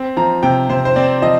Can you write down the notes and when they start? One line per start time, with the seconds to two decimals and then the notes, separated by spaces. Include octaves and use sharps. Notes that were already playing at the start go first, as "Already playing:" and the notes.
Already playing: C4
0.17 F3 A#5
0.43 C3 G5
0.69 C3 C5
0.85 C5
0.96 C4 D5
1.22 F3 D#5